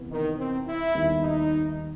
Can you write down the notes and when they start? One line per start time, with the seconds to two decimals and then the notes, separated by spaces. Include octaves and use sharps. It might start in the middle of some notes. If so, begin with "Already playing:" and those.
Already playing: C3 E3 B3
0.10 D#3
0.38 C4
0.67 E4
0.94 D#2 D#3 G3 B3
1.22 D#4